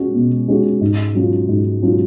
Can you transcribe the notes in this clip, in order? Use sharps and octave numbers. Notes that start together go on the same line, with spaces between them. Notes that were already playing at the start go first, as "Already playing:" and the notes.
Already playing: G#3 C#4 F#4
B2
G#3 C#4 F#4
G#2
F#3 C#4 F4
G#2
F#3 C#4 F4